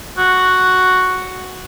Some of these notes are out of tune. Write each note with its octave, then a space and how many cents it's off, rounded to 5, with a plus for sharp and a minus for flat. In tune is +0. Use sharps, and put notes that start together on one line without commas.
F#4 +0